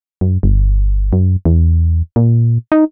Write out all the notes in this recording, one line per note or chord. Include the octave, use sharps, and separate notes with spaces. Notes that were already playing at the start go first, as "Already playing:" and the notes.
F#2
G1
F#2
E2
A#2
D#4